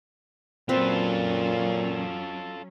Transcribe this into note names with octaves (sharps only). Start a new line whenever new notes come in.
A#2 F#3 C4 C#4 F4 A4 B4